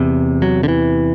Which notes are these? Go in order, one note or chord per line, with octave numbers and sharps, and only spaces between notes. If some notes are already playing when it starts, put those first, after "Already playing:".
Already playing: E2 C3
F#3
D3
E3